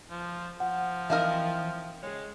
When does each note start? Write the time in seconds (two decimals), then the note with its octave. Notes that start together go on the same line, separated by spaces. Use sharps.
0.10 F3
0.60 F3 F#5
1.10 E3 C4 D#4 A#4 E5 F5 F6
2.03 G#3 G#4 C#5